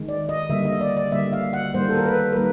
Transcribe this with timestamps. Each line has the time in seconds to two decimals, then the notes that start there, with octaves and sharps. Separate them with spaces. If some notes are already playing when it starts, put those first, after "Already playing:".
Already playing: D#3 G#3
0.09 D5
0.29 D#5
0.49 D3 G3 A#3 E5
0.65 D#5
0.81 D5
0.97 D5
1.12 D3 G3 A#3 E5
1.33 F5
1.53 F#5
1.75 D#3 G3 A#3 C5
1.89 A4
1.97 A#4
2.06 B4
2.32 A#4
2.36 D#3 G3 A#3 B4